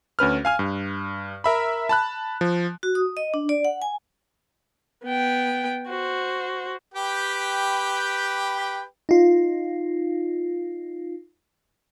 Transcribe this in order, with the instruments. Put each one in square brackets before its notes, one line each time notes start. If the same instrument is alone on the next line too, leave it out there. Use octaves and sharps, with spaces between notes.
[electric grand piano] D2 C#4 B4 F6
F5 G#5 F6
G2
A#4 E5 B5
A5 B5 F#6
F3
[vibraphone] F#4
D#6
D#5
D4
D5
F#5
G#5
[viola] B3 G5
F#4 C5
[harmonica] G4 B4 G5
[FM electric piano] D#4 F4